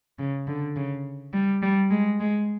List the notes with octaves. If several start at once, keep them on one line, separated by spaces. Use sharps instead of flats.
C#3
D3
C#3
G3
G3
G#3
G#3